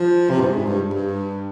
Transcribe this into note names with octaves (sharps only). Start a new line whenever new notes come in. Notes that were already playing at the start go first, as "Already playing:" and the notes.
Already playing: F3
C3
G2
G#2
G2
G2